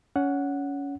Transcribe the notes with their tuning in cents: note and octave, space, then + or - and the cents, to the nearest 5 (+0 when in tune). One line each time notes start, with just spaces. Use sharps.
C#4 +20 F#5 +0